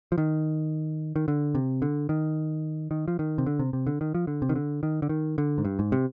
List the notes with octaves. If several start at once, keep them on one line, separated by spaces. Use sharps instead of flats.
F3
D#3
D#3
D3
C3
D3
D#3
D#3
F3
D#3
C3
D3
C3
C3
D3
D#3
F3
D3
C3
D#3
D3
D#3
D3
D#3
D3
G#2
G2
G#2
C3